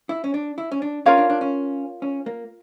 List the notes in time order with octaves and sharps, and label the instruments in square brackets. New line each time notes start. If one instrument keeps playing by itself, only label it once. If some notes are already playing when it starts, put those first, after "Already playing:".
[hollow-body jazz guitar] E4
C#4
D4
E4
C#4
D4
[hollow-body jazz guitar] C#4 [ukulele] F4 A#4 C#5 F5
[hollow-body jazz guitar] D4
D4
C#4
C#4
A#3